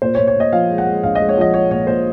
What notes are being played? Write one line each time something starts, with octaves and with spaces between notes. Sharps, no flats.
A#2 C5
A#2 C#5
C#5
A#2 D#5
F3 F5
G#3
F#5
G#3
A#1 F5
G#3 D#5
C#5
F3 D#5
G#3 C#5
A#2 C#5
A#2 C5